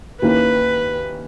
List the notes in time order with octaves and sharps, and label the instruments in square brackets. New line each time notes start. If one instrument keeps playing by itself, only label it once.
[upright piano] D#2 D#3 A#3 C#4 E4 [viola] B4